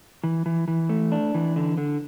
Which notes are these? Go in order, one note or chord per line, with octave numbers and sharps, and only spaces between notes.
E3
E3
E3
A3
D4
E3
D3
D3